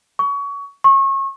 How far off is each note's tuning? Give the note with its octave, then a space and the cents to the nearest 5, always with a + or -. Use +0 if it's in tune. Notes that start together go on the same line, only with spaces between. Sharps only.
C#6 +25
C#6 -30